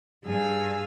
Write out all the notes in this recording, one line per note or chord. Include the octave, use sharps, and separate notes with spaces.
G2 G#4 F5 G#5 E6